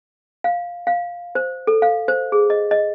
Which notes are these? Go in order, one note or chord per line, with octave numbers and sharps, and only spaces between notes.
F5
F5
C5
A4
F5
C5
G#4
D#5
D#5